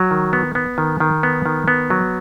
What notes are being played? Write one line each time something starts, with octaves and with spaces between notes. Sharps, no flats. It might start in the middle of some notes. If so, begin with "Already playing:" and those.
Already playing: F#3
D#3
B3
B3
D#3
D#3
B3
D#3
B3
F#3